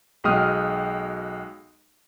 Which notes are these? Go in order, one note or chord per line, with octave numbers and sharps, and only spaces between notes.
B1 G#3 F#4 G5 D#6 F6